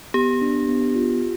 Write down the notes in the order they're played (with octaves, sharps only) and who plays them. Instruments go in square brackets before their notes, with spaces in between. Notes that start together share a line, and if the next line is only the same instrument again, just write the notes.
[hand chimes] B3 [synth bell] G4
[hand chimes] D4
B3
F4